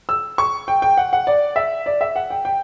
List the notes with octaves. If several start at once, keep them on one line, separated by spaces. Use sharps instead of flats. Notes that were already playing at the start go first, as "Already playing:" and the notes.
E6
C#6
G5
G5
F#5
F#5
D5
E5
D5
E5
F#5
G5
G5